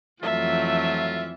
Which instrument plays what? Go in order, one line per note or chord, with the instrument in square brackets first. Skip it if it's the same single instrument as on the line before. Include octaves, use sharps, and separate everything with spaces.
[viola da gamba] F2 E3 [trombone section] F#3 A3 [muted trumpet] F4 [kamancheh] E5